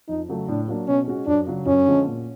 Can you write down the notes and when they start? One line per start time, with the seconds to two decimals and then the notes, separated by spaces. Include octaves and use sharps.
0.09 F2 D#4
0.28 C#3 F#3 A3
0.48 A2 D4
0.68 F#3 A#3 D4
0.88 B2 C#4
1.07 G#3 C#4 F#4
1.27 F#2 D4
1.47 C#3 F#3
1.66 F#2 C#4
1.86 D3 F3 G#3
2.06 A#2